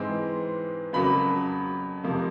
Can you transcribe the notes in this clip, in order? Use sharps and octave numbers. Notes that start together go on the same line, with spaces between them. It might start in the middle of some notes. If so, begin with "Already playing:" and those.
Already playing: G#2 E3 G#3 C4
F2 C#3 F#3 A#3 B5
F2 C3 F3 A#3